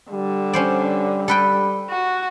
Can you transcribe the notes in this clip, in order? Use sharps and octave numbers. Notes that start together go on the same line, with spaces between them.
D3 G3
C#4 C5 D5
A4 B4 G5
F#4